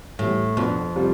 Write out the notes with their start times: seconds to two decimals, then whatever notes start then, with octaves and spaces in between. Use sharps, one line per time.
0.19 A2 E3 G3 B3
0.57 F2 B2 B3 D4
0.95 C3 G3 C4 F4